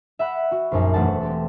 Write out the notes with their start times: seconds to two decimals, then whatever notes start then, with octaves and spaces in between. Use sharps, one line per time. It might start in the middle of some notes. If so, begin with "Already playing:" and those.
0.19 E5 F#5 B5 F#6
0.51 F#4
0.72 A#1 F#2 D#4
0.94 E1 F#3 A3 F#5 A5
1.21 C4 G4 A4